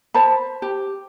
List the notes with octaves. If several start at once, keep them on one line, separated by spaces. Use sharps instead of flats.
C5 A5 B5
G4